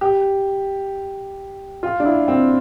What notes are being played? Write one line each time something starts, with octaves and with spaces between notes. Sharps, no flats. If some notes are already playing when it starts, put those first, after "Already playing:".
G4
F4
D4
E4
C4